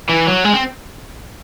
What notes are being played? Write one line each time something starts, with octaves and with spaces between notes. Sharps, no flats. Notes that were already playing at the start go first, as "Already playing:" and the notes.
E3
F#3
G#3
C4